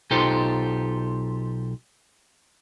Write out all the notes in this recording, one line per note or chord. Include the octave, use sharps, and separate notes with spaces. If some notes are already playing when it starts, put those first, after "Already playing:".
B1 D#4 F4 G4 A4 C5